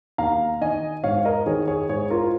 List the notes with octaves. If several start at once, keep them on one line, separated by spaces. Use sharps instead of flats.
D#2 F5 A#5
D#3 D#5 G#5
G#2 C#5 F5
A#4 D#5
D#3 G#4 C#5
G#4 C#5
G#2 G#4 C#5
F4 A#4